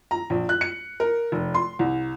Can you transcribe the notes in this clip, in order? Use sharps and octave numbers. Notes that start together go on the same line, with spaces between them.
A#5
A#1
F#6
C#7
A#4
F1
C6
C2